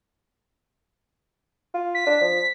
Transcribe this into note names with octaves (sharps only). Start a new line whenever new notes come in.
F4
B6
D4
F3